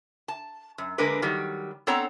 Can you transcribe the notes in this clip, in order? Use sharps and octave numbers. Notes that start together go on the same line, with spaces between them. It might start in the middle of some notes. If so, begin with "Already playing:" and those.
A5
F#2
D3 G#3 A#3 D4 A#4 B4
D#3 F#3 G3
B3 C4 D4 A4 C#5 A#5